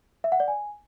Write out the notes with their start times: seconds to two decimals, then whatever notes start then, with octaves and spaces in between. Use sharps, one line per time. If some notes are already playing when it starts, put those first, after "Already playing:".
0.24 E5
0.32 F#5
0.40 D5
0.48 G#5